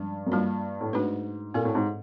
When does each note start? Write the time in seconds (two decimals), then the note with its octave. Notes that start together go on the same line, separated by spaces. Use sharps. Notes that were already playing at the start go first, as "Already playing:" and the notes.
Already playing: G2 F3 G#3 C#4
0.27 F#2
0.32 G2 G3 A#3 D4 F4
0.81 A2
0.93 G#2 A3 D4 F#4 B4
1.54 A#2 C4 E4 A4
1.65 A2
1.75 G#2